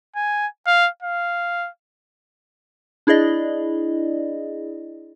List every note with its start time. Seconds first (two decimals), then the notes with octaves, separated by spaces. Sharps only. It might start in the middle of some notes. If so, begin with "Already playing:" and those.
0.16 G#5
0.66 F5
1.03 F5
3.07 D4 E4 G#4 D5 D#5